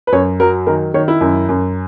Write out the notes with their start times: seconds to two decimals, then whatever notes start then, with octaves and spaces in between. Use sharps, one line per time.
0.07 B4
0.12 F#2 C#5
0.40 F#3 A#4
0.67 D#3 A#4
0.94 D#3 C#5
1.08 E4
1.21 F#2
1.49 F#2